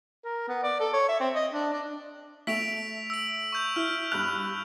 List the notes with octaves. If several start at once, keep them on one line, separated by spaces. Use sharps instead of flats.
A#4
B3
D5
A4
C#5
E5
C4
D#5
D4
D4
A3 E5 B6 D7 F7 F#7
E6 D7
C#6 G6 F7
E4 F6
G2 F#6 F7